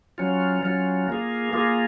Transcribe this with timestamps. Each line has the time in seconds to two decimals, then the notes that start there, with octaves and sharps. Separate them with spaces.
0.18 F#3 C#4 F4
0.63 F#3 C#4 F4
1.08 A#3 F4 G#4
1.53 A#3 F4 G#4